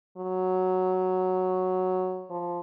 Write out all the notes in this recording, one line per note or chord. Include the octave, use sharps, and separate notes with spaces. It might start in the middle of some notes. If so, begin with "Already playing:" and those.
F#3
F3